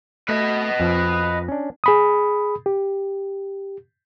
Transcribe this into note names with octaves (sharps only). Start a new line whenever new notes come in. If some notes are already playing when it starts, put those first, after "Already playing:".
A3 B4 D#5
F2 F3
C#4 D4
G#4 B5 D#6
G4